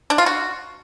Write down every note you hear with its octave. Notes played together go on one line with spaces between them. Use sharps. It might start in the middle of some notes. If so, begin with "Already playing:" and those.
D4
F4
F#4